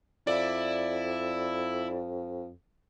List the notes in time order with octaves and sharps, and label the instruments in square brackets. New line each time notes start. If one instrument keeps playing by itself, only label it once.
[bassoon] F2 [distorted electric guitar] E4 [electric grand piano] D5